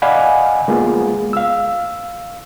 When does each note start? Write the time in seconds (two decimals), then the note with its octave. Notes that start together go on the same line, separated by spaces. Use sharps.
0.02 D5 D#5 F5 F#5 G#5 B5
0.68 G#3 A#3 B3 F4 G#4
1.33 F5 E6